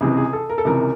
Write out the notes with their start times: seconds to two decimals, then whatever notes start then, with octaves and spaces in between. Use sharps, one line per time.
0.01 C#2 C3 E3 G#4
0.17 G#4
0.33 A4
0.49 A#4
0.58 A4
0.65 C#2 C3 E3 A#4